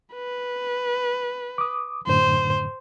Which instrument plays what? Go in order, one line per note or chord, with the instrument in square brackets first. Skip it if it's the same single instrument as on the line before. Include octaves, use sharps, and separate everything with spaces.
[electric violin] B4
[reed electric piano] D6 D#6
[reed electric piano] F#2 A2 D3 [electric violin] C5